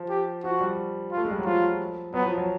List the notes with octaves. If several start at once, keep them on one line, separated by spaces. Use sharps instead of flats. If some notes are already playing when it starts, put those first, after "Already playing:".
Already playing: F3
G4
F3 F#4
G3
F4
A3
G#3
G3
F#3
F3 F4
F#3 B3
F3
F#3